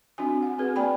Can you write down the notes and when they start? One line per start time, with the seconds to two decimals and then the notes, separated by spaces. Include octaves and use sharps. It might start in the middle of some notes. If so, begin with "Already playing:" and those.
0.18 C4 D4 F#4 G#5
0.43 F#5
0.58 C4 F#4 G#4 B4
0.76 A#3 D5 G5 G#5 B5